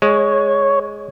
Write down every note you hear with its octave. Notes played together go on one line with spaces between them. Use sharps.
G#3 C#5